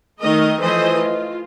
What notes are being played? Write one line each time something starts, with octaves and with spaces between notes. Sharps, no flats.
D#3 A3 A#4 D#5
E3 F3 A3 C5 D#5
F4